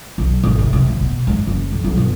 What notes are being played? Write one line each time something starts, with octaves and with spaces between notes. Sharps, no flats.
B1
G#1
C3
C3
A#2
B2
G#2
F#1
B1
B1
G1